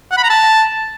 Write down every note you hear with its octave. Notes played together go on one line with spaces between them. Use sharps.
F#5
B5
A#5
A5